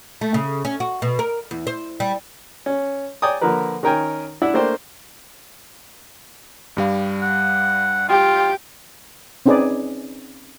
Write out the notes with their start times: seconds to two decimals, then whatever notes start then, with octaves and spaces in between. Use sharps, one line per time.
0.21 A3
0.34 C#3
0.65 C#4
0.80 F#4
1.02 B2
1.19 A#4
1.51 E2
1.67 C5
2.00 G3
2.66 C#4
3.22 C#5 D5 G5 G#5 A#5 D#6
3.41 D3 F3 A#3 A#4 B4
3.83 D#3 C#4 A#4 G5 G#5
4.42 D4 E4 E5 F#5
4.54 A3 A#3 D4 C5 G5
6.77 G2 G3 F5
7.22 F#5
8.09 F4 G4
9.46 C4 C#4 D#4 G#4 B4 D5